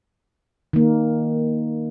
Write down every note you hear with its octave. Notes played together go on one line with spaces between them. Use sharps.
D#3 A#3